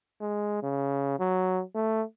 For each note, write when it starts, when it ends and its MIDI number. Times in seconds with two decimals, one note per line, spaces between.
0.21 0.60 56
0.63 1.17 49
1.19 1.62 54
1.75 2.02 57